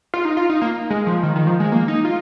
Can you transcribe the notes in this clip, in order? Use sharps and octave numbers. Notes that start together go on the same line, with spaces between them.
F4
D#4
F4
D#4
A#3
G#3
F3
D#3
D#3
F3
G#3
A#3
D#4
F4